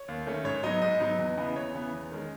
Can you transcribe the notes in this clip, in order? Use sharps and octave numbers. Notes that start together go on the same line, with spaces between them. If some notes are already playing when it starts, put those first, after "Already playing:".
Already playing: C#5
D#2
D#3 A3 C#4
G#2 C#5
F#3 B3 D#4 D#5
G#2 D#5
F#3 B3 D#4
E2
C#3 E3 B3
E2 C#5
C#3 E3 B3
E2
D#3 G#3 C#4